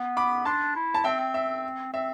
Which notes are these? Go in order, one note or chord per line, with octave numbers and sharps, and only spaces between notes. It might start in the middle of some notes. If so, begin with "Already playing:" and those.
Already playing: B3
B5 D6
D4 A5 C6
E4
A5
C4 E5 G5
C4
E5
C4 E5